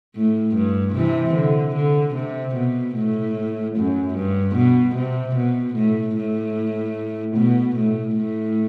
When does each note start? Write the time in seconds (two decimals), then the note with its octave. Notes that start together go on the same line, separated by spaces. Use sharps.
0.16 A2
0.56 G2
0.95 C3 E3
1.35 D3
1.75 D3
2.15 C3
2.56 B2
2.96 A2
3.76 F#2
4.15 G2
4.56 B2
4.96 C3
5.36 B2
5.76 A2
6.16 A2
7.37 B2
7.76 A2
8.16 A2